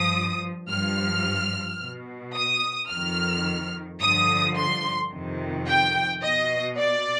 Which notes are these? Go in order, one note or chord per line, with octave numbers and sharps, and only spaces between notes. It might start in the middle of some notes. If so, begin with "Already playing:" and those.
Already playing: G2 F3 D#6
G2 F3 F6
B2
D#6
F2 D#3 F6
G2 D3 F3 D#6
C6
F2 C3 D#3
G5
B2 D#5
D5